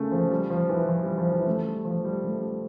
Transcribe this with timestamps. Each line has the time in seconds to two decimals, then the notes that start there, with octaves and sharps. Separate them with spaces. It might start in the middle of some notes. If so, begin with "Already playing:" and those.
Already playing: C#3 A3 A#3
0.12 F3
0.31 G3
0.50 F3
0.69 E3
0.89 F3
1.03 G3
1.18 F3
1.32 E3
1.47 A3
1.66 G3
1.85 F3
2.05 G3
2.24 A3
2.42 G3